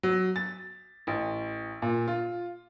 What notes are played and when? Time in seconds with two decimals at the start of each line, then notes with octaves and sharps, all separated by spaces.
0.03 F#3
0.36 A6
1.07 A1
1.82 A#2
2.08 F4